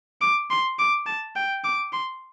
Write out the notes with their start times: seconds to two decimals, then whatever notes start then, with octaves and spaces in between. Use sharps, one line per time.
0.21 D6
0.50 C6
0.79 D6
1.06 A5
1.36 G5
1.64 D6
1.93 C6